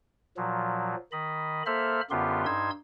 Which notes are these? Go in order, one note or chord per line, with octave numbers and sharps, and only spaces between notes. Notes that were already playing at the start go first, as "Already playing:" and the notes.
A#2 F3 F#3
D#3 D#5 B5
A#3 A4 C5 E5 B5 F6
F#2 D3 B3 F4 G4 C6
G2 D#4 C6 E6 G#6